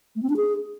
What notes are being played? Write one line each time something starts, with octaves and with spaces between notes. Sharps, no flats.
A3
C4
D4
G#4